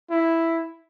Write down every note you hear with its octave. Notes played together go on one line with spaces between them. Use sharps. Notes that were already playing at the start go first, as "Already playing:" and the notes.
E4